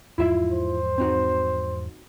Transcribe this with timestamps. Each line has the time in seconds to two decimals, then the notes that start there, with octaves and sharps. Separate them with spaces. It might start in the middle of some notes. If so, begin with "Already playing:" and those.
0.18 E2 G#2 F3 E4 F4 E5
0.51 C5
0.98 C4 D#4 F#4